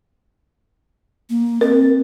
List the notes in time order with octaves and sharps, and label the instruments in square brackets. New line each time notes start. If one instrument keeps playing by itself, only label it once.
[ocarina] A#3
[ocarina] C4 [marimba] A#4